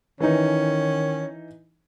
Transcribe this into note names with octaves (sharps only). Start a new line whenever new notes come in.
D#3 E3 C#4 D#4